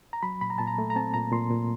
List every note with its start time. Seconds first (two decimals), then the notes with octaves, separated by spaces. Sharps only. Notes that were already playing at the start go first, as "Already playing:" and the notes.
0.13 A#5
0.23 F#3 B5
0.41 A#2 B5
0.50 A#5
0.58 A#2 A5
0.67 A#5
0.78 A3
0.90 A#5
0.96 C4 A5
1.14 A#2 A#5
1.32 A#2 C6
1.50 A#2